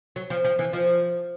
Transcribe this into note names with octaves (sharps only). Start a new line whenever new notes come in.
F#3
F3
F3
E3
F3